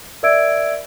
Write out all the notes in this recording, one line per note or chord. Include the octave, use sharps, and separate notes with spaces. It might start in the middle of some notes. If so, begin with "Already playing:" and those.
A#4 D5 E5 E6 G#6 D7